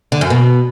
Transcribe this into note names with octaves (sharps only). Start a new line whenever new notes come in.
D3
F#2
B2